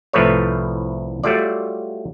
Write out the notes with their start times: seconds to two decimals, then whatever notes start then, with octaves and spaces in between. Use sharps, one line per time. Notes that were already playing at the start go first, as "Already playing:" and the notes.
0.13 C2 A2 F3 A3 B4 C#5
1.24 F#3 G3 A3 F4 D5